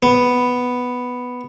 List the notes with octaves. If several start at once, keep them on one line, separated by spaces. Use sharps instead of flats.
B3